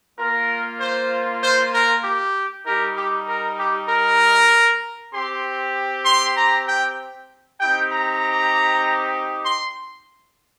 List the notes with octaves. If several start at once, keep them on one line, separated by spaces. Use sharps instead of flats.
A#3 F4 A#4
C5
C5
A#4
G4
G3 D#4 G4 A#4
G4
A#4
G4
A#4
C4 G4 C6
C6
A#5
G5
C4 D#4 G4 G5
A#5
C6